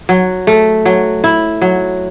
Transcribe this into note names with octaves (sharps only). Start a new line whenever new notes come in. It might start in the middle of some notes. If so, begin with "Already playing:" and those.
F#3
A3
F#3
E4
F#3